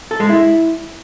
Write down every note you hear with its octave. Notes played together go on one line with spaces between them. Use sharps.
A4
G#3
E4